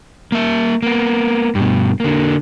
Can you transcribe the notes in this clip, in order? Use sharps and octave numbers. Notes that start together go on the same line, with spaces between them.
A#3 E5
A#3 B3
G2 B2
D3 A#3